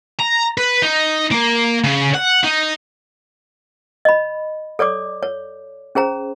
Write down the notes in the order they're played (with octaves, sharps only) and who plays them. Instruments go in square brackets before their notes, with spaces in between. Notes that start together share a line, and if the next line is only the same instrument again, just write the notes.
[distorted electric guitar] A#5
B4
D#4
A#3
C#3
F#5
D#4
[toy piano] D#5 B5
A4 C#5 D5 D6
C#5
C#4 G#4 C5 A#5